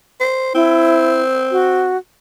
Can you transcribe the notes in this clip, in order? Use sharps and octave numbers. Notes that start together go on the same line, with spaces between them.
C5
C4 E4
F#4